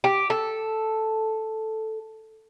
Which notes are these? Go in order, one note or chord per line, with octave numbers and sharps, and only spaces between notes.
G4
A4